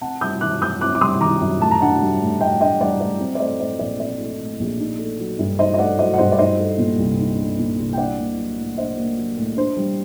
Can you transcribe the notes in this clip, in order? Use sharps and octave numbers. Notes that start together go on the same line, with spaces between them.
C4 F#5 A5
G3 D#6 G6
D#3 D6 F#6
F#2 D#6 G6
C4 D6 F#6
D6
G3 C6 D#6
D#3 A#5 D6
F#2
A2 A5
A#5
D4 F#5 A5
G3
A2
A2 D#5 G5
D4 D#5 G5
G3 D5 F#5
A2 D5
C4
D5
A3 C5 D#5
A2 C5 D#5
A#1 D5
C4 D5
A3
A2
A#1
D#4
A3
F#3
G2
D#4 C5 D#5
D#5
A3 D5 F#5
F#3 C5 D#5
F#5
G2 C5 D#5
D5
D#4 C5 D#5
A3
A#2
C2
D#4
A3
A#2
C2
G5
D4 D5 F#5
A#3
F#3
A2
D4 C5 D#5
A#3
F#3
A2
D4 C5
G3